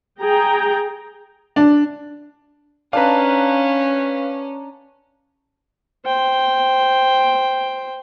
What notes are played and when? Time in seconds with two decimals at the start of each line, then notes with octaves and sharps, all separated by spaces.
0.21 G#4 G5 A#5
1.56 D4
2.93 C#4 D4 B4 F5 A5 A#5
6.06 C5 G5